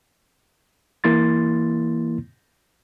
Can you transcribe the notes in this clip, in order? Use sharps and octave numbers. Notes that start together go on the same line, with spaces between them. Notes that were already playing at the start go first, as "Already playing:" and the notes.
E3 A#3 E4 C6 A6